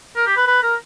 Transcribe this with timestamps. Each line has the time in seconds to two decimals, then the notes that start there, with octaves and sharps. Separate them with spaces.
0.16 A#4
0.26 G4
0.37 B4
0.47 B4
0.63 A#4